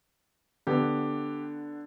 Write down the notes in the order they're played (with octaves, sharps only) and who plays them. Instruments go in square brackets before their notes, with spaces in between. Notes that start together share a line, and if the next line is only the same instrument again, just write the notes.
[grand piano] D3 B3 [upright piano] G4